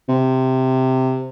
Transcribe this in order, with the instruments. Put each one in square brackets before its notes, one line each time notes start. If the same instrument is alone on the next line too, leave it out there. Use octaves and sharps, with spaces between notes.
[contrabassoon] C3